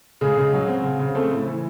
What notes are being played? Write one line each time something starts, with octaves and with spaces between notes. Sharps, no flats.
C#3 G#3 G#4
C#3
F#3
C4
C#3
C#3
A3 C4 A4
A2
E3